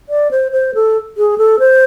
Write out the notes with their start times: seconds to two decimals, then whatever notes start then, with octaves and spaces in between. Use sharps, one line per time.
0.09 D5
0.31 C5
0.52 C5
0.75 A4
1.17 G#4
1.38 A4
1.59 C5